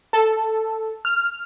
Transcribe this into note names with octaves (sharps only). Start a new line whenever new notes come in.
A4
F6